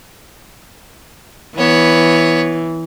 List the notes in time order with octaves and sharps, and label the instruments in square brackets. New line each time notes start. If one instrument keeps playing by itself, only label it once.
[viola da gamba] E3 [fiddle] B3 C#5